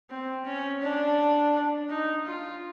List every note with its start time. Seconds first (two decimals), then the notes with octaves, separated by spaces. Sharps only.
0.10 C4
0.46 C#4
0.82 D4
1.90 D#4
2.26 F4